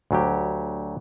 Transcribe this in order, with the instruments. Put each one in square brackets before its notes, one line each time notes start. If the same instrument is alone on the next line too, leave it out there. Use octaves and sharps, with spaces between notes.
[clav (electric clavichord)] D2 F#3 G4